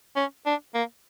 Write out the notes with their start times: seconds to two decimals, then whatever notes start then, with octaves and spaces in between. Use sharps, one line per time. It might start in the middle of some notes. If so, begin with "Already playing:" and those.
0.16 C#4
0.46 D4
0.74 A#3